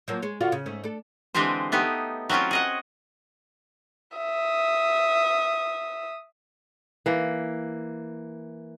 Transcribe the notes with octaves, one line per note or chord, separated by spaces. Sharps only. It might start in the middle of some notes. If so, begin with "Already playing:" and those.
F3 F#3 A#3
G#3 C#5
D3 F4 F#4
C#3
G#2 A3 C#4
D4 A4
D3 E3 G#3 C4 G4 C5
A3 B3 D#4 G4
F#3 C4 C#4 E4 F4
G#4 D#5 F#5
E5 D#6
E3 A#3